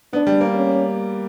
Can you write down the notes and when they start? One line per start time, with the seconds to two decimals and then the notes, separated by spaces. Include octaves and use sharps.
0.13 B3 D4
0.27 G3
0.41 A#3
0.55 C#4